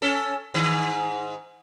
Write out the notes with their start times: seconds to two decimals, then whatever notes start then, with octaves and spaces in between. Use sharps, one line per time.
0.02 C#4 A4
0.54 G#2 D#3